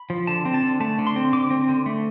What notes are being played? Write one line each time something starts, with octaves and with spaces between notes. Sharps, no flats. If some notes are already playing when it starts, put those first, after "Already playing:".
Already playing: B5
F3
D3 A5
C4
A5
D3
A3 A5
D3
C6
C4
D3 D6
C4
D3
A3